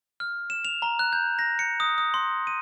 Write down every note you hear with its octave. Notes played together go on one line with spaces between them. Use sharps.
F6
E7
F7
A#5
F#6
G6
A#6
C#7
D#6
D#6
C6
D#7